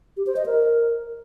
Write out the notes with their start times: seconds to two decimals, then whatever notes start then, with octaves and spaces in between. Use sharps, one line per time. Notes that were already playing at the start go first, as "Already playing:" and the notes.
0.17 G4
0.27 C5
0.36 D#5
0.46 A#4